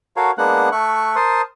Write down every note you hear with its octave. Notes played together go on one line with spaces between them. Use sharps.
F#4 A4 A#4 C#5 F5
G#3 A#3 B3 D4 F#5 F#6
A3 E5 C#6 F#6
A#4 C5 A5 C6 D#6